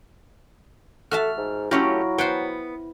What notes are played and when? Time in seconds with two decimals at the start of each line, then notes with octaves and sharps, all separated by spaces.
1.11 F#4 A4 E5 A5 F6
1.37 G#2
1.71 F#3 A3 C#4 E4 F4 G4
2.18 B3 C5 F#5 G5